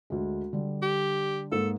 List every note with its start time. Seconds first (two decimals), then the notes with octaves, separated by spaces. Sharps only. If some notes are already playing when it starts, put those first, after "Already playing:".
0.10 D2 G#3
0.53 D3 G3
0.82 G4
1.52 G#2 A#3 A4